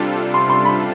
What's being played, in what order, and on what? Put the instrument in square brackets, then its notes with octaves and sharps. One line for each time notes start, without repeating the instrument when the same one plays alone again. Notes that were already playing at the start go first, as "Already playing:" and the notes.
Already playing: [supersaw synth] C3 G3 D4 F4 A4
[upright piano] C6
C6
B5